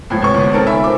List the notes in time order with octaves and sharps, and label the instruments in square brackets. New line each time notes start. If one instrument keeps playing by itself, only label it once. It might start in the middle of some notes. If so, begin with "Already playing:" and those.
[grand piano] A2 F3 [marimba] G#3 G#6
[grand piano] C2 C#6 [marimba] B4 C#5
[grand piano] D2 B3 [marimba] C3
[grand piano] C4 A4 A#4 [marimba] D#4 F6
[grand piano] E5 [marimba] G#5 B5
[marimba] F4 A#4 C5 [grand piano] D6